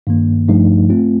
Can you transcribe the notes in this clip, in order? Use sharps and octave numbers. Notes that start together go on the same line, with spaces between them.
G2 D#3 A#3
G2 F3 A3 D#4
A3 C4 F4